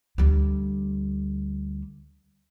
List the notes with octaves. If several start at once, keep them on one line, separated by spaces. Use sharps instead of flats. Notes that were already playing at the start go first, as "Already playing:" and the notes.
D2 G3